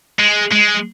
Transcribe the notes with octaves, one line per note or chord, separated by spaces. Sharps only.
G#3
G#3